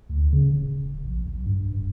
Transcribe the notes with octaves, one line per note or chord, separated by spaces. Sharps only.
D2
C#3
D1
E1
D1
A#1
B1
G2
D#1